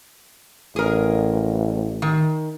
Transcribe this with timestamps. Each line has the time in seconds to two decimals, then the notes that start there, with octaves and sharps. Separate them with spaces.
0.76 A1 G#4 A#4
2.02 D#3